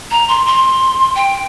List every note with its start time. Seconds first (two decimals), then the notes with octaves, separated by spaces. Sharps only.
0.11 A#5
0.28 C6
0.46 C6
1.16 G5